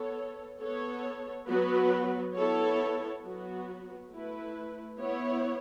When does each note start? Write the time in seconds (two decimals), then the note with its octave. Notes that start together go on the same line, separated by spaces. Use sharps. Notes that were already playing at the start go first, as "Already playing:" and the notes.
Already playing: B3 A4 C#5
0.60 B3 A4 C#5
1.47 F#3 B3 F#4 B4
2.35 B3 E4 A4 C#5
3.23 F#3 B3 F#4
4.11 A3 E4 B4
4.98 B3 E4 C#5